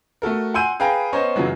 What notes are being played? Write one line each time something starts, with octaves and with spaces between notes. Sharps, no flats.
A3 F#4 A4 A#4
F#5 G#5 C6 E6 G6 D#7
G#4 B4 F5 G5 A#5
B3 C#4 C5 C#5 D#5 A#5
F#2 C#3 E3 F#3 G#3